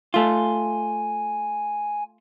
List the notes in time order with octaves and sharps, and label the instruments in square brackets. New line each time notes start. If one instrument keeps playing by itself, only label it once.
[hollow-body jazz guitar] A3 F4 [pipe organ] G#5